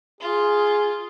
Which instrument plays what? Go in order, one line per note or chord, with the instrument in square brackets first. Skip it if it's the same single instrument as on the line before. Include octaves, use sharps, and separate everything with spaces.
[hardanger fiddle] F4 [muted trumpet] G#4